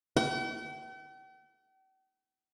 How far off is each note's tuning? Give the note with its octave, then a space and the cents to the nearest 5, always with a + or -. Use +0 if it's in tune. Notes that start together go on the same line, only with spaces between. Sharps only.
G5 -45